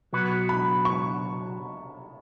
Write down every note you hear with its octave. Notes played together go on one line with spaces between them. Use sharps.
B2 F#3 B3 F#4 B4
B5
C#6